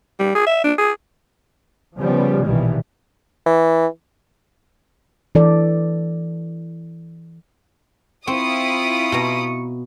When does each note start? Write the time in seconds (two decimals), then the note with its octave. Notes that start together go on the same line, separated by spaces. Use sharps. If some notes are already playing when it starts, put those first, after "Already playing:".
0.20 G3
0.35 G#4
0.47 E5
0.64 D4
0.78 G#4
1.97 C#3 F3 G3 B3
2.46 A#1 B2 D#3 E3 G3
3.46 E3
5.35 E3 A4 D5
8.27 C4 E4 F4 C#6 D#6
9.12 B2 A#5